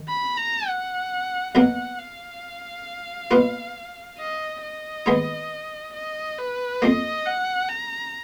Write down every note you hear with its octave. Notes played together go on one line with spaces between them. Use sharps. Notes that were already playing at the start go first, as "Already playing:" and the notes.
Already playing: D#3
B5
A#5
F#5
B1 B2 F#3 A#3 F#5
F5
B2 A#3 F4 B4
D#5
D#5
D#2 D#3 G#3 B3 D#4
D#5
B4
F2 F3 A#3 D#5
F#5
A#5